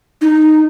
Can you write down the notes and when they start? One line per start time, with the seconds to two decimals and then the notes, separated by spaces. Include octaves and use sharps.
0.21 D#4